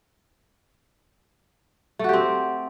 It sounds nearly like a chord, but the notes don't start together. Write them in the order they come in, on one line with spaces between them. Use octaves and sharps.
A3 F#4 G4 C4